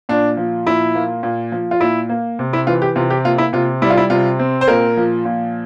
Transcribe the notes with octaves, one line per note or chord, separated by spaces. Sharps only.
A#2 D4
F3
A#2 E4
A#3
A#2
F3
F4
A#2 E4
A#3
C3
E4
E3 F4
G4
C3 F4
G4
A#3 F4
E4
C3 F4
G3 E4
F4
E4
C3 F4
C4
C5
A#2 A#4
F3
A#2